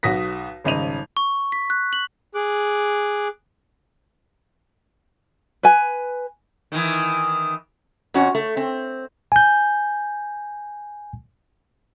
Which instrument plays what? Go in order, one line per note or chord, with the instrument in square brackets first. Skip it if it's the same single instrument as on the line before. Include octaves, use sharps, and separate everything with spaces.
[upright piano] B1 F#4 D#6 A#6 B6
D#1 G#1 C#3 D#5 D#7 F7
[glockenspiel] C#6
B6
F#6
F#7
[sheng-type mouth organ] G#4 D6 F#6
[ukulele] B4 G#5
[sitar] D#3 E3
[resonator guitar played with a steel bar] F2 C#4 F#4
A3
C4
[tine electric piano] G#5 G6